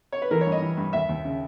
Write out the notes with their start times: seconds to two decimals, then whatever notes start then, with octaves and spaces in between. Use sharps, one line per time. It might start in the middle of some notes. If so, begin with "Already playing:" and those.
0.12 C#5
0.22 B4
0.31 E3 A#4
0.41 C#5
0.47 G2
0.52 D#5
0.62 E3
0.77 G2
0.93 D#2 E5
1.09 D#2
1.25 C#3